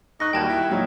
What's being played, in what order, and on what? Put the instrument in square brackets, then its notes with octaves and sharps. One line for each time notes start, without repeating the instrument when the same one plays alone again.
[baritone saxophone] D#4 [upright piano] C#6 F#6 [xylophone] A#6
[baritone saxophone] D#2 [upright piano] G3 F#4 [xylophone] G5 A5 G#6
[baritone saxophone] E4
[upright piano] A#2 F#3 D#4 [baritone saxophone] F3